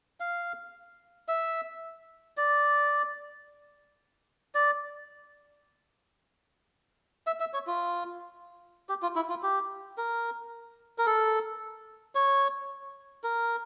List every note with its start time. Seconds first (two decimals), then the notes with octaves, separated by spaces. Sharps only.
0.20 F5
1.28 E5
2.37 D5
4.55 D5
7.27 E5
7.40 E5
7.54 C#5
7.67 F4
8.89 G4
9.02 F4
9.16 E4
9.30 F4
9.43 G4
9.98 A#4
10.98 A#4
11.06 A4
12.15 C#5
13.24 A#4